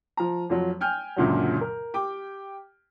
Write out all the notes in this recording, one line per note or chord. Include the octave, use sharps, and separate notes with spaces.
F3 A#5
F2 F3 F#3
G5 G#5 F6 G6
C#2 F#2 A#2 D3 F#3
A#4
G4 G5 D6